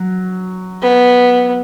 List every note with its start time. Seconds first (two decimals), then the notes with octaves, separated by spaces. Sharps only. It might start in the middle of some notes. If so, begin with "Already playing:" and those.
Already playing: F#3
0.82 B3